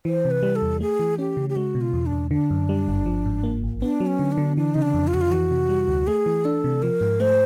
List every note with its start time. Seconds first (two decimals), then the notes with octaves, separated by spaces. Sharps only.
0.05 E3 C5
0.25 C3
0.31 B4
0.43 G3
0.56 A4
0.62 E2
0.80 A3 G#4
0.99 E3
1.18 C#4 G4
1.37 C#3
1.49 G4
1.56 G#3 F#4
1.75 B2
1.81 F4
1.93 E2
2.06 D4
2.12 E2
2.31 D3 D4
2.51 F#2
2.69 G3
2.88 G1
3.06 F3
3.26 G#2
3.43 A#3
3.63 A1
3.82 B3 D4
4.00 F#3
4.06 C#4
4.19 D3
4.32 D4
4.38 D3
4.57 E3 D4
4.74 C#3 D#4
4.82 D4
4.94 F2
5.07 F4
5.14 F2 F#4
5.21 F4
5.32 E3 F#4
5.51 C3
5.69 G3
5.88 D2
6.07 A3 G#4
6.26 E3
6.45 D4 A4
6.64 C3
6.82 F3 A#4
7.01 G#2
7.20 A3 C5